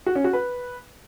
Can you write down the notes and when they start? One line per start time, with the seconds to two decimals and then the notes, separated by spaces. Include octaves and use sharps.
0.06 F#4
0.15 C#4
0.24 F#4
0.33 B4